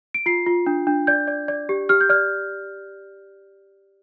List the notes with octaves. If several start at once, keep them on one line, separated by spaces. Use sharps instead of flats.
D7
F4 C7
F4
D4
D4
D5 G6
D5
D5
G4
G4 F6
G6
D5 F6